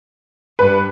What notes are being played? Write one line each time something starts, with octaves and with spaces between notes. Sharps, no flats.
G2 B4